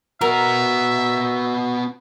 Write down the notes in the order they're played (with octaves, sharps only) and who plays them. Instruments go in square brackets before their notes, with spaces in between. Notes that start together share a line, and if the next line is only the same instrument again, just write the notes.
[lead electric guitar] B3 F#4 [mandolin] A#4 [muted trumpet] E5 [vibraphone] F#5